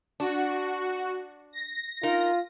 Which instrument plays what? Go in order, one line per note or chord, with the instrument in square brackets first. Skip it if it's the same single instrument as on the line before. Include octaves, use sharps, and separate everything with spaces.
[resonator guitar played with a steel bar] D4 [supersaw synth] F#4
[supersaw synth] A#6
[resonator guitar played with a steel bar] D#4 A#4 [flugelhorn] F4